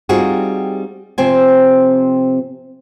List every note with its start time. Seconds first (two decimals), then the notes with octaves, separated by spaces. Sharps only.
0.09 G3 C4 D#4 F4 F#4 G#4
1.18 C3 F3 C4 C5 G5 G#5